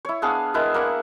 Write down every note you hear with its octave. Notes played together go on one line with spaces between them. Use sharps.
E4 C#5
B3 D4 G#4 F5
G#3 B3 E4 A#4
A#3 D5 F#5